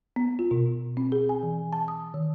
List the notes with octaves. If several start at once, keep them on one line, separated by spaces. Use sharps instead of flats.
B3
F4
B2
C4
G#4
G#5
E3
A5
D#6
D#3